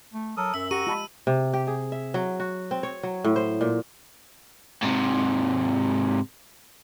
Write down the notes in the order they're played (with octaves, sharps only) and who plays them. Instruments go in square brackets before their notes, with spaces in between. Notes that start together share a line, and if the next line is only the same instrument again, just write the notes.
[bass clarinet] A3
[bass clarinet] F#3 [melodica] A4 A#4 D#6
[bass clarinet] F#2 [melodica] E5 [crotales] E6
[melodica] F#4 A#5 C#6 [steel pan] G4 [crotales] D#7
[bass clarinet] G#3 [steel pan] F4 A5 B5
[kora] C3
G4
G#4
E5
F#3
F#4
C4
C#5
F#3
A2
C5
A#2
[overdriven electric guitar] G#2 C3